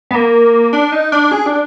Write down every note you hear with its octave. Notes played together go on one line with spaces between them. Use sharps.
B3
A#3
D4
D#4
D4
G#4
D4